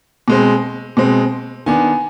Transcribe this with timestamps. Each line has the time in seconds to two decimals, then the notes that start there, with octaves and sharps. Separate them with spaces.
0.28 B2 G#3 C4
0.97 B2 G#3 C4
1.66 D#3 B3 D4 G#5